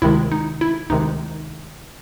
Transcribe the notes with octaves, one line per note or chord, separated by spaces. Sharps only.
D2 C3 D#3 G#3 E4
D#4
E4
D2 C3 D#3 G#3 D#4